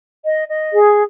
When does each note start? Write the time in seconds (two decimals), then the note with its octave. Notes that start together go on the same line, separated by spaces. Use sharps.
0.25 D#5
0.48 D#5
0.72 G#4